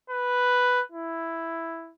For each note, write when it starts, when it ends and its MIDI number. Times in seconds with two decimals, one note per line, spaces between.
0.10 0.81 71
0.92 1.92 64